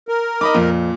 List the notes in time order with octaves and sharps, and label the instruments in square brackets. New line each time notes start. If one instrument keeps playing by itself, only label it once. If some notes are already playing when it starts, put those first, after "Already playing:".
[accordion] A#4
[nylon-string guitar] D#4 [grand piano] D#5 B5 D6
[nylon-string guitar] F2 [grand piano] A#2